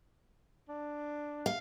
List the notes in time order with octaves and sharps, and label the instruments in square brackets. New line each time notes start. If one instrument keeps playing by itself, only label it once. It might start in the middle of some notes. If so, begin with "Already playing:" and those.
[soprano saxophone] D4
[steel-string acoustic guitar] F5